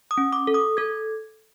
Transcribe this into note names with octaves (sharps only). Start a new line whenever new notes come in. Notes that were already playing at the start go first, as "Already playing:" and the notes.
D#6
C#4
D6
A4
D#6
A4 G#6